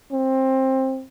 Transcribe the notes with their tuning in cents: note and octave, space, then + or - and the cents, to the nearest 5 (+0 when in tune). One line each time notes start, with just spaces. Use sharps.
C4 +20